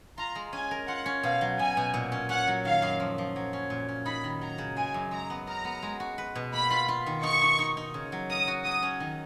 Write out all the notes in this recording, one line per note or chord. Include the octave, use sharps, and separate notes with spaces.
F4 A#5
G#3
C#4 G#5
A#4
F4 F#5
C#4
B2 F5
F#3
B2 G#5
B2
A#2
C#4
C#4 F#5
F#3
D#3 F5
F#2
F3
F3
F#3
C#4
A#2
C#4
D#4 B5
D#3
F#3 A#5
C#3
G#3 G#5
F#2
G#3 A#5
B3
A#4 A#5
B3
G#3
F#4
B4
B2
A#3 B5
F4
F4
D#3
D#4 C#6
D#4
D#4
D#4
C#3
F#3
A#4 D#6
F#4
F#3 D#6
C#4
D#3